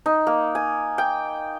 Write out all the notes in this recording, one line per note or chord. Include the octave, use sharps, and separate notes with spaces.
D#4
A#3
G#5
G5